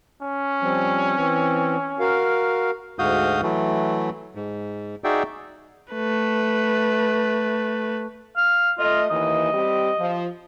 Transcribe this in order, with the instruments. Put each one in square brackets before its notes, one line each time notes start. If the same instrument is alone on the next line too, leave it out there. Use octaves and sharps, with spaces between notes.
[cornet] C#4
[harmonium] F3 G3 C4
E3 C4
F#4 A#4 F5
[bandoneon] D2 G#2 F#4 F5 D#6 G6
E3 F#3 A3
G#2
D#4 F#4 G#4 D5 E5 G5
[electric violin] A3 B4
[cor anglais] F5
[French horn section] A3 D#5 [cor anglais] F4
[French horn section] D#2 E3 [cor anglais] D#5
[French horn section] G3 C4 G4
F3